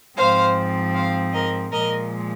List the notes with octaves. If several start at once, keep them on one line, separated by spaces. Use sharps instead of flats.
G#2 F3 C4 C5 F5
C5 F5
A#4 D#5
A#2 F3 G#3 A#4 D#5